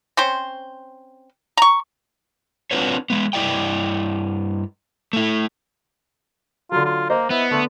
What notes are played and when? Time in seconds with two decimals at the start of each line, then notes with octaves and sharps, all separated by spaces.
0.17 C4 C#4 C5
1.57 A#5 C#6
2.71 C4 D4 F4 F#4 B4 C#5
3.10 G#3 B3
3.33 G2 E4 D5 D#5 G5
5.13 A3 E4
6.72 D3 F#3 F4
6.85 F4
7.10 A#3 C5 D#5
7.30 B3 E4
7.51 D3 A3